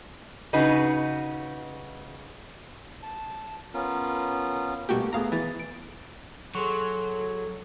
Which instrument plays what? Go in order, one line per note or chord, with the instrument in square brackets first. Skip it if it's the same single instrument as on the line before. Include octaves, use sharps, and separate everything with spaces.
[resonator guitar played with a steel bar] C#3 D#4 F#4 B4
[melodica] A5
B3 C#4 F4 A#4
[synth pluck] B2 F#4 G4 [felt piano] G3 A3 A#3
[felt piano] A3 B3 G#4 [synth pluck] F5 A#5
[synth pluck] E3 [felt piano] A6
[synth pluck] D7
[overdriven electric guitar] F#3 [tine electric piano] G#4 C6 C#6 [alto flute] A4